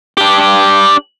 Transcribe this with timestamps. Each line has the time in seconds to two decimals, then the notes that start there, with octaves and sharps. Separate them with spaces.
0.17 D4 G4